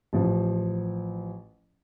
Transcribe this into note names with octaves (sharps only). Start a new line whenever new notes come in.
A1 F3